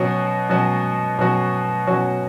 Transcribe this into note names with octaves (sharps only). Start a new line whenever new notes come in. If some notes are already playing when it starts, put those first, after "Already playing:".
Already playing: B2 F#3 C#4 F#4
B2 F#3 C#4 F#4
B2 F#3 C#4 F#4
B2 F#3 C#4 F#4